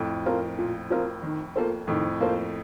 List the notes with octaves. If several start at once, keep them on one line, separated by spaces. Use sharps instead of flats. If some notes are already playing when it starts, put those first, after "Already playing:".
Already playing: F2 A2
F3 C4 F4 A#4
A#2
F3 C4 F4 A#4
D#3
A#3 F4 A4 C5
F2 A2 D#3
A#3 F4 A4 C5